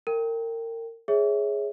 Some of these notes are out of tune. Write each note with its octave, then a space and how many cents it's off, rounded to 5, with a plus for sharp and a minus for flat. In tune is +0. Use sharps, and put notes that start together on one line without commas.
A#4 -30 G5 +0
G#4 +0 C#5 +0 E5 -15